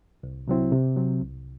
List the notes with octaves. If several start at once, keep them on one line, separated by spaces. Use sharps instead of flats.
C2
C3 F#3 C4 E4
C3
F#3 C4
C2